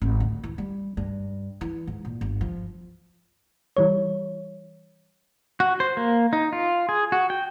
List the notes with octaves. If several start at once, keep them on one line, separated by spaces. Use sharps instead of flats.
G#1
D2
E3
G3
G2
E3
G#2
A#2
G1
F3
E3 G3 C#5
F#4
C5
A#3
D#4
F4
G#4
F#4
G5